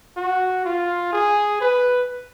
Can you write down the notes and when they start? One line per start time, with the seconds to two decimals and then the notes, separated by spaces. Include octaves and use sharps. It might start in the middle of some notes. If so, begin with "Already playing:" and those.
0.17 F#4
0.65 F4
1.13 G#4
1.60 B4